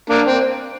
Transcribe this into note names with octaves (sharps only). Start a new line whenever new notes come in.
A#3 D4
C4